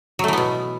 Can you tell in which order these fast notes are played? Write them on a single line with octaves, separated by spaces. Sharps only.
F#3 A3 E3 B3 B2